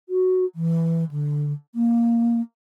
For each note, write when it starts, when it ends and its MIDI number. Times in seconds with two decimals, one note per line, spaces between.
0.09 0.45 66
0.55 1.04 52
1.11 1.52 50
1.75 2.41 58